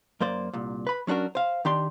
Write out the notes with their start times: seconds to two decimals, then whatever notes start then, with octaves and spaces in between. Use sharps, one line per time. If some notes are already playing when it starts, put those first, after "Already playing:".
0.21 F#2 A#3 C5 D5
0.54 C2 A#2
0.87 B4 B5
1.07 F#3 C#4 D4 F#4 A#4
1.35 C5 F5
1.65 D#3 D4 G4 D5 C6